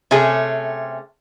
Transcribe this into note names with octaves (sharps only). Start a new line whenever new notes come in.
C3 A3 C#4 G#4